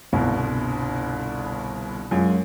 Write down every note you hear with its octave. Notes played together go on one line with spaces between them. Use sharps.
G1 C2 G2 B2
F#2 G#3 F4